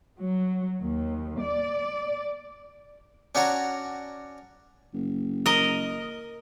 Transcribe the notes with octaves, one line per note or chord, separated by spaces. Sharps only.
F#3
D#2
D5
C#4 D4 F#4 C#5 A#5
F#1
A#4 D#5